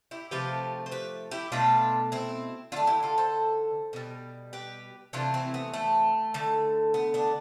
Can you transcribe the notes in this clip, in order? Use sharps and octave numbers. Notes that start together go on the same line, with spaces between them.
E4 G4
C3 F3 A3 G4 B4
C5
G4 B4
E4 G4
B2 A3 D4 F4
C4 E4
D3 A3 D4 F4
E4 G4
F4 A4
A4 C5
B2 G3
G4 B4
C3 E3 A3 D4 F4
C4 E4
B3
A3
D3 A3
B3
B3 D4